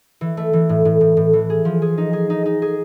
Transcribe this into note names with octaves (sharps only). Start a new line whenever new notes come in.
E3
A3
E3
A2
A2
A2
A2
E3
G#4
F3
G#4
D#4
G#4
D#4
D#4
G#4